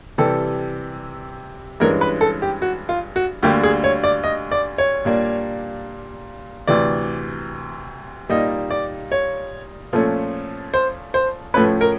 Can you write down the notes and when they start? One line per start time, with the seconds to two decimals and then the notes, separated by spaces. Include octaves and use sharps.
0.18 C3 E3 G3 A4
1.80 G2 E3 G#3 C#4 A#4
2.01 B4
2.21 A4
2.42 G4
2.62 F#4
2.89 F4
3.16 F#4
3.43 D2 D3 G3 A#3 G4
3.63 G#4
3.84 C#5
4.04 D5
4.24 D#5
4.52 D5
4.78 C#5
5.05 A#2 G3 A#3 D4
6.67 D2 C3 E3 D5
8.29 A#2 G3 A#3 D#4 D#5
8.71 D5
9.12 C#5
9.93 A#2 F3 A3 C#4
10.74 C5
11.14 C5
11.54 A2 F3 A3 C#4 B4
11.81 A#4